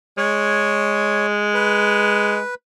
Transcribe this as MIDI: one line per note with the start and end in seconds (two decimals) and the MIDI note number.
0.18 2.40 56
0.18 1.27 73
1.54 2.55 71